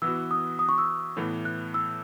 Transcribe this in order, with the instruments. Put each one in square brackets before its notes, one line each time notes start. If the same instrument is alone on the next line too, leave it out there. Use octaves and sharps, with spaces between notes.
[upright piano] E3 B3 F#4 [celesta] E6
[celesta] D#6
D#6
C#6
E6
[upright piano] A2 E3 B3
[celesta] F#6
E6